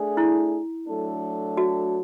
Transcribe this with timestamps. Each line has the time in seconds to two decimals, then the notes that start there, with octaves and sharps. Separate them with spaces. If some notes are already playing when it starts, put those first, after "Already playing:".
Already playing: A3 D4 G#4
0.17 E4
0.87 F#3 A3 D4 A4
1.57 F#4